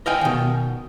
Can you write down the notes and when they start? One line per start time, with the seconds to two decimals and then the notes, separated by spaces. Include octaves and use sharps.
0.06 D#5 F5 G5 G#5
0.21 B2 D#3